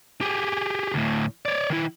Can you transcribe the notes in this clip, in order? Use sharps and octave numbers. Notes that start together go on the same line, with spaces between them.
G4 G#4
D2 A2
C#5 D5
D#3 E4